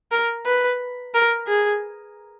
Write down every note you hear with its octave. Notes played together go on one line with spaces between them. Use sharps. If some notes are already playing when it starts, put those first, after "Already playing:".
A#4
B4
A#4
G#4